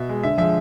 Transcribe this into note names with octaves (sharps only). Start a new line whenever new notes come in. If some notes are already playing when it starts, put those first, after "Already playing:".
Already playing: B2 E5
G#3
D3 E5
F3 G#3 E5